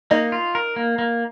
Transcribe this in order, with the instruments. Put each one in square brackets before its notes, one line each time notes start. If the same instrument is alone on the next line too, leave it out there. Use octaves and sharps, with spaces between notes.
[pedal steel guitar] A#3 [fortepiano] D#4
[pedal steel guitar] F4
A#4
A#3
A#3